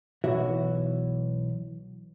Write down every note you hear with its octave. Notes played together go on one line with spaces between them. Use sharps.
B1 E3 F#4 E5